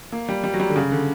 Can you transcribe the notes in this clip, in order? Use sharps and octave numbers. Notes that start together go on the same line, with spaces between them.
A#3
G3
G3
F#3
G3
D3
C#3
D3